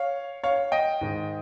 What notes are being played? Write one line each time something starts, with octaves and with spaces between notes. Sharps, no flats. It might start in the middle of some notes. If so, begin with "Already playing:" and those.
Already playing: C#5 F5
C#5 F5
D#5 G5
G#2 D#3